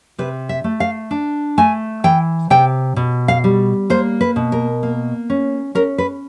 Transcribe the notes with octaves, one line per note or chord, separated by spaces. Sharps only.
C3 B4
E5
A3
F5
D4
A3 G#5
E3 G5
C3 G5
B2
F5
G3
A#3 C5
B4
B2
A#4
A#3
C#4
C#4 A#4
B4